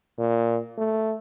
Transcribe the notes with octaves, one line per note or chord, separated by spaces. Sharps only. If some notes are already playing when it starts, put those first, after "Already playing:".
A#2
A3